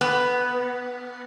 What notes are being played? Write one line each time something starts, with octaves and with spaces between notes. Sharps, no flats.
B3